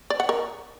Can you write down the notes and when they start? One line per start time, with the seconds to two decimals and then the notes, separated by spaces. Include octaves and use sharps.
0.10 D5
0.20 F#5
0.29 A#4